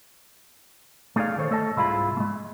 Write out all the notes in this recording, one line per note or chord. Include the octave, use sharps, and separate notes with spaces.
A3 D#4 G#4 D5 F5
D#3 A4 C5 C#5
A3 A4 D#5 A5
C2 G#2 E4 F4 G#4 B5
G#3 A3